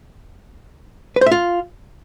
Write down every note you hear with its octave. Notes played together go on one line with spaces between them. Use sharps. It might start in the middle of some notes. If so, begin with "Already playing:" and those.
B4
C5
E5
F4